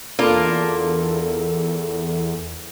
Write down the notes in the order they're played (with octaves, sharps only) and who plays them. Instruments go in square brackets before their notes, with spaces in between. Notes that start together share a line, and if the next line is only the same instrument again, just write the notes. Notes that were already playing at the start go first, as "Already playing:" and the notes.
[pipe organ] E2 [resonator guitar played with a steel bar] A#3 D4 F4 [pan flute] A4